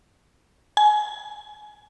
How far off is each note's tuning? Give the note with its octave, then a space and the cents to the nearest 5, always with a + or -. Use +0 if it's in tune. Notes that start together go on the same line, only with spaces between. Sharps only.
G#5 +25